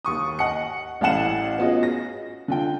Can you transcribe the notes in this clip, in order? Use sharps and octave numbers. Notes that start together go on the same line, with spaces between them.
D#2 C#6 D#6
D#5 F#5 C#7
A1 A2 F5 F#5 E7
B3 C#4 F4 F#4 G#4 D#5
A#6
D3 F4 G5